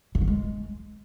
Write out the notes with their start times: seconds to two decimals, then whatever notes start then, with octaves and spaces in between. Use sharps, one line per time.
0.15 D3
0.21 F3
0.28 G#3